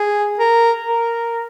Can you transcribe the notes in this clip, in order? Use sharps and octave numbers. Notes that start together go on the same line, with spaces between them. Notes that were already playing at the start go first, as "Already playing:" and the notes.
Already playing: G#4
A#4
A#4